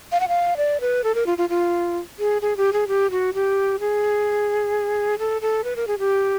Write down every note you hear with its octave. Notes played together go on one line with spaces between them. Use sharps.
F5
F#5
F5
D5
B4
A4
A#4
F4
F4
F4
G#4
G#4
G4
G#4
G4
F#4
G4
G#4
A4
A4
B4
A#4
G#4
G4